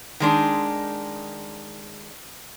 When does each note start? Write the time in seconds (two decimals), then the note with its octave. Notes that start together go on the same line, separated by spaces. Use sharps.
0.20 D#3 G#3 D4 D#4